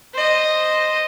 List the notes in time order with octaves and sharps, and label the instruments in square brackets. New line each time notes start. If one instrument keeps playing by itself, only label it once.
[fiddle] C5 D#5